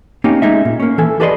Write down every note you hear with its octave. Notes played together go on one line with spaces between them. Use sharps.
A#3 C4 C#4 D#4 G4
G#3 C#4 D#4 E5
A#2
A#3 C#4
E3 A4 G#5
G4 A4 B4 D5 D#5 C6